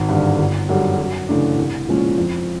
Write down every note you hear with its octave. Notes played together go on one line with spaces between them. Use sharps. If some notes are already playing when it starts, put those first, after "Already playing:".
Already playing: G#1
G2 D3
G1
F#2 D3 G3
F#2
C#3 E3 A3 D4
C2
A#2 F3 G#3 C#4
F2